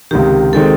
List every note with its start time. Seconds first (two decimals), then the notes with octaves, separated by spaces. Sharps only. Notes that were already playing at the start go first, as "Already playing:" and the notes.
0.11 C#2 C3 D#3 G4
0.53 D#3 G#3 C4 D#4 A4